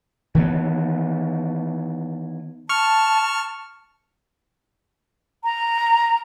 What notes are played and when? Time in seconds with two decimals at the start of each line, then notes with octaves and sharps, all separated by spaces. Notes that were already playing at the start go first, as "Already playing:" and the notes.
0.35 D#3 E3 A#3 B3
2.69 A5 C#6 F6
5.44 A#5